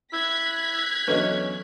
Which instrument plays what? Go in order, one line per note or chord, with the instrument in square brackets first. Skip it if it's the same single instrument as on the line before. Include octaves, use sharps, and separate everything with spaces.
[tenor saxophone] E4 [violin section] F#6 G#6 B6
[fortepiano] E2 D3 F#3 [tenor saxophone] C#4 [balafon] B4 D#5